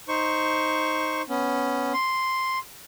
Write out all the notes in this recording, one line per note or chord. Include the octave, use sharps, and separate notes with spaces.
D#4 C5 C#6
B3 C#4
C6